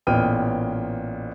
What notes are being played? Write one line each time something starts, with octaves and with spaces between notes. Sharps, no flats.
A1 A#2 B3 G5 F6 D#7